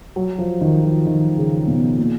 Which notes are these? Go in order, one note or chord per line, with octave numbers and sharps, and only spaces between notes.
F#3
F3
D#3
F3
D#3
C#3
B2
A#2